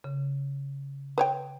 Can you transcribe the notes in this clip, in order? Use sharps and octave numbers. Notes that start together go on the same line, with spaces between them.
C#3
B4 C#5 G5